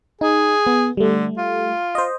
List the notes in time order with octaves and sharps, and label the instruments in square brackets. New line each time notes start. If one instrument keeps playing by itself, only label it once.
[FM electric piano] D#4 [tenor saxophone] G#4
[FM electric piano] B3
[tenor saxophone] D3 [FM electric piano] G3 A3
[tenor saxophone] F4
[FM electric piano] C5 D#5